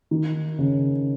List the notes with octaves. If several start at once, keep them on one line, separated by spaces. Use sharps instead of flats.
D#3
C#3